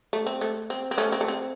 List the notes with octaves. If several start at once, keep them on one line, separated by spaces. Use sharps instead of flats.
A3
C4
A3
C4
C4
A3 C#4
C4
A3
C4